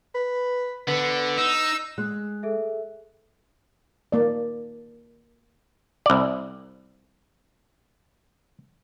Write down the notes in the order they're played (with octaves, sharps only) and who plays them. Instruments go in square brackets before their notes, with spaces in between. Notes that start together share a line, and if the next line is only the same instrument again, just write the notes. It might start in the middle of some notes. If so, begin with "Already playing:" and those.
[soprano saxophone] B4
[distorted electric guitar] D3 [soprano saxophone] B3
[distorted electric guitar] D#4 [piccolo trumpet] E6
[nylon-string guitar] G#3 [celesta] F#6
[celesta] G#4 A4 E5
[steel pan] A#3 D5
[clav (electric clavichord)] C2 D5